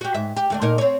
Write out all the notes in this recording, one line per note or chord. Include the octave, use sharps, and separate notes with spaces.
F#4 G4
G#2 E5
G4
D2 A3 D4
A#2 D#4 A#4
C4 C#5